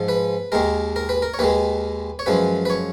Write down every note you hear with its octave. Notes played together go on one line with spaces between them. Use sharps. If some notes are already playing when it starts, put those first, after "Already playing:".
Already playing: G#2 F3 G#3
B4
D#2 D#3 G#3 A#4
A#4
B4
A#4
C#5
D#2 D#3 G#3 B4
C#5
F#2 F3 G#3 B4
B4
C#5